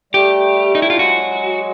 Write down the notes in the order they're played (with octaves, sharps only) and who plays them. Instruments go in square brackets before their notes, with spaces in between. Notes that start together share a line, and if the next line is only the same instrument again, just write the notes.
[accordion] G3 A3 [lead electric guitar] G4
[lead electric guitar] D#4
E4
F4
[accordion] F#3 G#3 [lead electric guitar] F#4